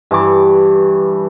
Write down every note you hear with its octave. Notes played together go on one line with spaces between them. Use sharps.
G2 E3 C#6 D6